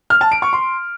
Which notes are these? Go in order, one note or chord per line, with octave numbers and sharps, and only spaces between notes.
F6
A5
D7
C#6
C6